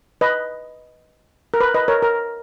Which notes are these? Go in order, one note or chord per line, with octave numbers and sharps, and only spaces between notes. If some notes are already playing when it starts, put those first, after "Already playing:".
B4 D#5
A#4
B4
B4 D#5
A#4 C#5
A#4